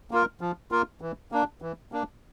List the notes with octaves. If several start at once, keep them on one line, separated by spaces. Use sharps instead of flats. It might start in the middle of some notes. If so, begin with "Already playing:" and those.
A#3 F4 A#4
F3
A#3 F4 A#4
E3
A#3 D4
E3
A#3 D4